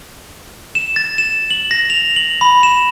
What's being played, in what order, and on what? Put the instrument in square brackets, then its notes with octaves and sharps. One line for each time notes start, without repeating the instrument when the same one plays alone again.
[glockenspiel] E7
A6
E7
F#7
A#6
F7
F#7
B5
E7